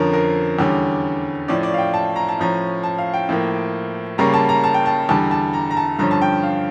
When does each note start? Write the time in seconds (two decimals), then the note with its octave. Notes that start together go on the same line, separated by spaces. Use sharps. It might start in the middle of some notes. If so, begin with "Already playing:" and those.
Already playing: F2 D3 F3 C#4 A#4
0.13 A#4
0.59 E2 D3 G3 C#4
1.48 A2 F3 C#4 D5
1.63 D5
1.74 F5
1.78 G5
1.94 A5
2.16 A#5
2.29 A5
2.38 A2 F3 C#4 A#5
2.83 A5
2.98 F5
3.14 G5
3.29 A2 F3 A#3
4.18 C#3 G3 A#3 C#4 A#5
4.34 A5
4.49 A#5
4.64 A5
4.74 G5
4.86 A5
5.09 E2 D3 G3 A5
5.31 A5
5.53 A#5
5.71 A#5
5.77 A5
5.99 G2 D3 F3 C#4 A#5
6.11 A5
6.22 G5
6.43 F5